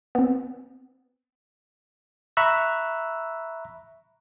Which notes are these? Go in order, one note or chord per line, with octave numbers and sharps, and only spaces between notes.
B3 C4
E5 A#5 B5 C#6 E6 F#6